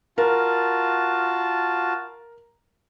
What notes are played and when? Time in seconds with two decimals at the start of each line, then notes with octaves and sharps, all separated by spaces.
0.18 F4 F#4 A#4 A5